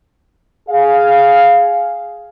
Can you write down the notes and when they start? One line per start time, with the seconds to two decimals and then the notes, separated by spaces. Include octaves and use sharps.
0.69 G#4 F5